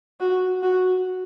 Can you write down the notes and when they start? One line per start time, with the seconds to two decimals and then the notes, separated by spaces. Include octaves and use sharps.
0.20 F#4
0.62 F#4